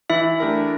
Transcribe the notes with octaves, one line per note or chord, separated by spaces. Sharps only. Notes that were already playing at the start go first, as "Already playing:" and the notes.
E3 E4 E5
A3 D4 G4 A#4